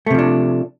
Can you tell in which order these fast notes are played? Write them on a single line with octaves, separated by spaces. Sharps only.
A3 C3 F3 D4